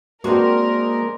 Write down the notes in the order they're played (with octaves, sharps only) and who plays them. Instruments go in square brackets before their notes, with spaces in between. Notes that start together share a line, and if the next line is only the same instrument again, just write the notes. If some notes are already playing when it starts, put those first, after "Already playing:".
[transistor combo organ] G#3 A#3 [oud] C4 F#4 [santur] D4 C5 D#5 [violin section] A#4